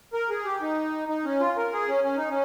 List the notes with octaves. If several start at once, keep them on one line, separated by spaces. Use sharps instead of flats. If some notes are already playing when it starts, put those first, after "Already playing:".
A#4
G#4
G4
D#4
D#4
C#4
F4
A#4
G#4
C#4
C#4
D#4
C#4